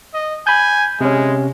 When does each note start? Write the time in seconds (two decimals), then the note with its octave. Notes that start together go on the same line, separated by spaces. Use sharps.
0.14 D#5
0.47 G#5 B5 G6
1.01 C3 G#3 C#4